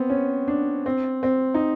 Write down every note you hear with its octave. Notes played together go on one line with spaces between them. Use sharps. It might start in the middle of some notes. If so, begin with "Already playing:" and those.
Already playing: B3 C4
C#4
D4
C4
C4
D#4